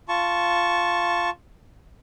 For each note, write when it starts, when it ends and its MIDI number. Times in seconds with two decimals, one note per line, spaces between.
0.09 1.30 65
0.09 1.30 81
0.09 1.30 85